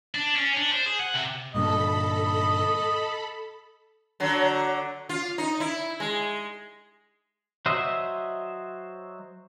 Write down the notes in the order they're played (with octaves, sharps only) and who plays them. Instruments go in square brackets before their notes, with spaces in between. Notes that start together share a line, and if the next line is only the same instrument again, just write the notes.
[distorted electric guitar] D4
C#4
D4
C5
G#4
F#5
C3
[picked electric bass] G2 A#2 D3 [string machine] A4 B5 [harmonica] D#5
[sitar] D3 F#3
F4
D#4
E4
G#3
[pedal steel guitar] F#3 C5 D#5 E5